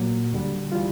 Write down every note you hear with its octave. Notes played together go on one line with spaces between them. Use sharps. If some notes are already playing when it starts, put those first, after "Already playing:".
Already playing: A#2 F#3 A#3
D2 D3 G3
E3 G3 F4